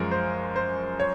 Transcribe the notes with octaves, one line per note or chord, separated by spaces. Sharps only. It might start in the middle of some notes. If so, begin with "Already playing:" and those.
Already playing: F#2 F3 G#3 A#4
C5
C5
C#5